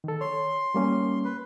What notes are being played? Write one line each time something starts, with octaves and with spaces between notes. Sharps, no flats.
D#3 A4
C#5 C6
G3 A#3 C#4
B4